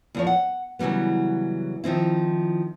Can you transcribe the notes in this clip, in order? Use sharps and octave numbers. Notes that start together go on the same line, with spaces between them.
E2 F3 C#5
F#5
C#3 E3 F#3 G3 B3
D#3 F3 C4 E4